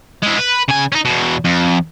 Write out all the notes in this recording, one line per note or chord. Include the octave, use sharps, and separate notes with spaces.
G#3 E4
B4
C#3 G#5
C#4 D#4
E2 B2
F2